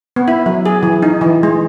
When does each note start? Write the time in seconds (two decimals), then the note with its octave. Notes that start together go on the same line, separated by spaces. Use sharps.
0.16 B3
0.28 E4
0.46 F#3
0.66 G#4
0.83 E3
1.03 D#4
1.21 E3
1.43 G#3